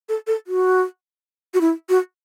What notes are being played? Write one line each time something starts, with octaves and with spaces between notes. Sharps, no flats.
A4
A4
F#4
F#4
E4
F#4